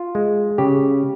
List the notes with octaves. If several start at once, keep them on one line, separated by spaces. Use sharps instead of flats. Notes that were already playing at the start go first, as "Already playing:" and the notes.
Already playing: F4
G#3
C#3 G4